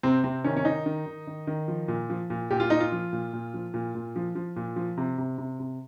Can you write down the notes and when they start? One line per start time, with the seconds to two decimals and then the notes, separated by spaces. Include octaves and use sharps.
0.03 C3 C4
0.23 C3 C4
0.44 D#3 C#4
0.57 C#4
0.65 D#3 D#4
0.86 D#3
1.06 D#3
1.27 D#3
1.47 D#3
1.68 F3
1.88 A#2
2.10 F3
2.30 A#2
2.51 A#2 G4
2.60 F4
2.70 A#2 D#4
2.80 F4
2.92 F3
3.12 A#2
3.33 A#2
3.54 F3
3.74 A#2
3.95 A#2
4.16 F3
4.35 F3
4.56 A#2
4.76 F3
4.97 C3
5.18 C3
5.38 C3
5.60 C3